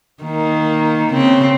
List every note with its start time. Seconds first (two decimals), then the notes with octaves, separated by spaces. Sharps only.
0.23 D#3 A#3
1.12 C#3 C4